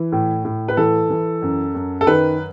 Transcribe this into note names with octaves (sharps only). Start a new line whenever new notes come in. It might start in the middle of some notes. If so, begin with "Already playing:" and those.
Already playing: E3
A2
A2
B4
E3 A4
E3
F#2
F#2
A4
D#3 B4